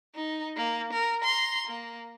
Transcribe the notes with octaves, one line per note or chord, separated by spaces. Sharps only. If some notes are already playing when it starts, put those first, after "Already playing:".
D#4
A#3
A#4
A#5 C6
A#3